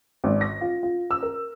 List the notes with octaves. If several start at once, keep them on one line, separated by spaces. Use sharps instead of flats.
G#1
A#6
F4
F4
E6
A#4